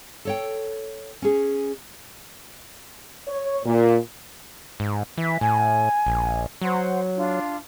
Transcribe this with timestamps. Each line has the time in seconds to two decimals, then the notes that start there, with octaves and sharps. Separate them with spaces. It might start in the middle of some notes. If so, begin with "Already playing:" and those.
0.25 A4 C#5 G5
1.22 C#4 G#4
3.28 C#5
3.65 A#2
4.80 G#2
5.18 E3 E5
5.41 A2 G#5
6.07 A#1
6.62 F#3 C5 F#5 C6
7.16 D4 F4